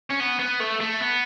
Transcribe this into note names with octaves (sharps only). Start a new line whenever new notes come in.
C#4
B3
B3
A3
A3
B3